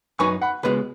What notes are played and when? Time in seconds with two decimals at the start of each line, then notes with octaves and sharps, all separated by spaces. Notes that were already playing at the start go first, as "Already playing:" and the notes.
0.19 F#2 F#3 D#4 B4 G#5 C#6
0.41 F#5 B5
0.63 C#2 B2 G#3 B4